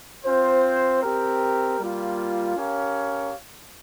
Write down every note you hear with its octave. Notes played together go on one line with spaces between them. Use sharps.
C4 F4 C5
C4 G4 A#4
G3 A#3 F4
C#4 G4 A#4 C#5 F5